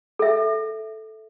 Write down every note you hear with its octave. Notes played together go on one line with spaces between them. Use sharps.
A4 E5